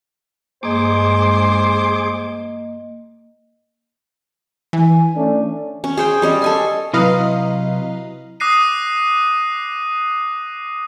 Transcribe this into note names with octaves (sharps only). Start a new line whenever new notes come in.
G2 G#3 A#3 G#4 C5 D#5 D6
E3 G#5
A3 C#4 D4
C#4
G#4 C5 G5
G3 C#4 D#5
A4 G#5 C6
C3 F#3 E4 B4 D#5 F5 A#5
D6 D#6 F#6 A#6 C7 D#7